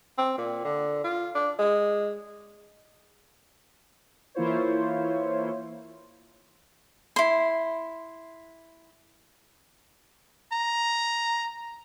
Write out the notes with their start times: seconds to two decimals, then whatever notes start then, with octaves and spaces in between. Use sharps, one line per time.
0.18 C4
0.38 A#2
0.65 D3
1.04 F4
1.35 D4
1.59 G#3
4.35 E3 A#3 E4 F4 C5 C#5
7.16 E4 C6
10.53 A#5